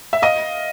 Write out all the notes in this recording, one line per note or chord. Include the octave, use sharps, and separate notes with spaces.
E5
D#5 F5